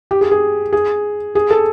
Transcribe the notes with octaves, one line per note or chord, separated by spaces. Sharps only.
G4
G#4
G#4
G#4
G#4
A4